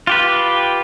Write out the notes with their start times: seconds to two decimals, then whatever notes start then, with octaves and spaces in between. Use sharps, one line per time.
0.07 F4 G4 B4